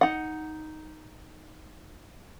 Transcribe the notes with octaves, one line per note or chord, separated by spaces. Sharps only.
D#4 F#5